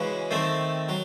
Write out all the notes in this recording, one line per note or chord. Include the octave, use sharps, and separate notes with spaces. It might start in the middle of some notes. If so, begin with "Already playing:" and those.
Already playing: C#3 E3 G#3 C#4 F#4
D#3 A3 C4
F#3